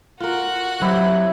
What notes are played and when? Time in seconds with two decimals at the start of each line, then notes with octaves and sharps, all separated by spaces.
0.20 F4 F#4 A#4 F#6
0.82 F#3 C4 E4 G4